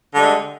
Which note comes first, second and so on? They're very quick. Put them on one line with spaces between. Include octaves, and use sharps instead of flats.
D3 G3 G#3